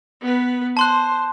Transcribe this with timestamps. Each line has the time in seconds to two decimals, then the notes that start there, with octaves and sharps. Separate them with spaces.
0.21 B3 B4
0.77 C5 A5 C6 F#6